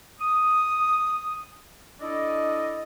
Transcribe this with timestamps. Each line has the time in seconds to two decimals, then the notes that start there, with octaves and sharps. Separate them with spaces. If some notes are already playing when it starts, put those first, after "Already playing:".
0.20 D#6
2.01 D4 E4 A4 D5 D#5